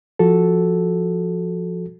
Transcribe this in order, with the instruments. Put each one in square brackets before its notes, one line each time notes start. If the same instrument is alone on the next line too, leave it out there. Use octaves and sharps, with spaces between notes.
[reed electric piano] F3 F#4 A4